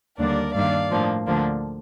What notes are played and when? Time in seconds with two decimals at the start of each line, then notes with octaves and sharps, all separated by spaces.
0.19 D#2 D3 G3 A#3 D4 A#4 D5
0.55 G2 D#3 A#3 D4 D5 F5
0.91 A2 F3 A#3 D4
1.26 D2 D3 F3 A#3 D4